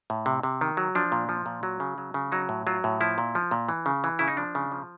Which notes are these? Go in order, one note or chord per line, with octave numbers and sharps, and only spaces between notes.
A2
C3
C3
D#3
F#3
F3 D4
A#2
F3
A#2
F#3
C#3
F#3
C#3
F#3 D#4
A2
F#3 F4
A2
F3 E4
A#2
F3
A#2
E3
C#3
E3
C#3 E4
D#4
F3 D4
C#3
F3